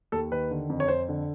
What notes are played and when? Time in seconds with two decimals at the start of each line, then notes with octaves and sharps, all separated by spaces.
0.12 D#2 A4
0.32 D#3 B4
0.51 D3
0.70 F2
0.80 C#5
0.88 F2 C5
1.09 D3